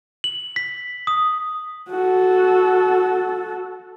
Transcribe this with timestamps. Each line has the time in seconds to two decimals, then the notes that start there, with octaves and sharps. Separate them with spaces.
0.24 F#7
0.56 B6
1.07 D#6
1.90 F#4 A4